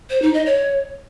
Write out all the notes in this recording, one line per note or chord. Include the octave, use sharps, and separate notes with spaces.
C5
D#4
D#5
C#5